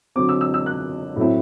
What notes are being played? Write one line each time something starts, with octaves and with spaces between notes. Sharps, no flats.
D3 F#3 C4 D6
E6
E6
E6
F#6
A2 F#3 A3 C4 E4